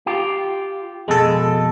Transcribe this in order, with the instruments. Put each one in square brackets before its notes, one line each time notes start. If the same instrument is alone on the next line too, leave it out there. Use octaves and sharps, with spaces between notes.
[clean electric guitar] F4 G4
[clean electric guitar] F2 B2 [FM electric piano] G#3 A4